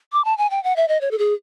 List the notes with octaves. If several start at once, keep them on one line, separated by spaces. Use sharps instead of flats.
D6
A5
G#5
G5
F#5
E5
D#5
C#5
A4
G#4